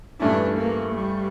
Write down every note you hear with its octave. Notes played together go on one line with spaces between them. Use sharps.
G2 E3 A3 C#4 D4 E4
A#3
G3